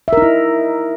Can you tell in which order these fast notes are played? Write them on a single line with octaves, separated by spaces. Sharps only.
E5 A#4 D#4 E4